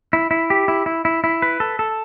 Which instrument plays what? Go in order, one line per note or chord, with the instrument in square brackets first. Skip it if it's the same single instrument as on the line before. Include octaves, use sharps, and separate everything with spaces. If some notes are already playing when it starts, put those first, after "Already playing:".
[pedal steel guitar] E4
E4
G4
E4
E4
E4
E4
B4
A4
A4